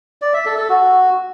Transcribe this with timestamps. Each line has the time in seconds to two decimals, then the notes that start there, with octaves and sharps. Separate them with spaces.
0.22 D5
0.34 E5
0.46 A4
0.57 A4
0.69 F#4